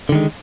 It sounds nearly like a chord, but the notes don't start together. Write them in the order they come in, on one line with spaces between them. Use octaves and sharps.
D3 D#3 G#3